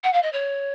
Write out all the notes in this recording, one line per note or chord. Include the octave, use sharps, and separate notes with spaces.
F#5
F5
D#5
C#5